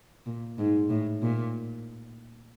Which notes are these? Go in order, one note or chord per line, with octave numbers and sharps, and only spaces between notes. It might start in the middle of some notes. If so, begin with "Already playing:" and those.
A#2
G#2
A2
A#2